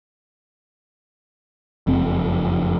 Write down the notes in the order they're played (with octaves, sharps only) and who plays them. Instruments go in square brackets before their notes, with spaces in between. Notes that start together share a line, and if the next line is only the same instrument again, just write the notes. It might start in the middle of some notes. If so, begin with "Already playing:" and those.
[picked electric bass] F#1 F2 C4